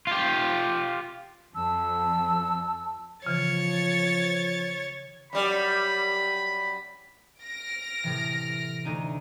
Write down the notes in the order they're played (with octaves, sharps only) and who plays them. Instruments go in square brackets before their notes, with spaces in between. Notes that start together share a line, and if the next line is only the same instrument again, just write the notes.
[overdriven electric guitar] F4 G4
[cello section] F2 [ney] A5 [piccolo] E6
[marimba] C#3 E3 [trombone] F3 [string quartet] C#5 A6
[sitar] F#2 G3 [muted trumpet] B5
[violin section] F6 A#6 D7
[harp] A2 C3 E3
D2 D#4 D#7